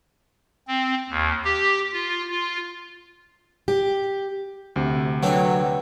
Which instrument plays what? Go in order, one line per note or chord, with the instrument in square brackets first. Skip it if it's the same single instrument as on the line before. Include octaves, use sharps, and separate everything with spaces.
[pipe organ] C4
D#2
G4
F4
F4
[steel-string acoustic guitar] G4
[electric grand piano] D2 C3
[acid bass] F#3 [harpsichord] D4 A4 C#5 [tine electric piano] B4 F#5 G5